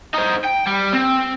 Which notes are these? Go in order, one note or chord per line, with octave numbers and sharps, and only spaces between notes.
D#4 C5
G5
G3
C4